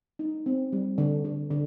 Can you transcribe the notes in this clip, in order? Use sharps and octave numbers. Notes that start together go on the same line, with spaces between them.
D#4
C4
G3
D3
D3
D3